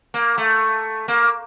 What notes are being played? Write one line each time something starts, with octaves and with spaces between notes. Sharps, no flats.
A#3
A3
A#3